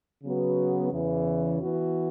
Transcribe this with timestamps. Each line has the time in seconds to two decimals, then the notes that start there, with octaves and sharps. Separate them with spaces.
0.23 C#3 F#3 B3 F#4
0.92 E2 C#3 E3
1.60 E3 B3 F#4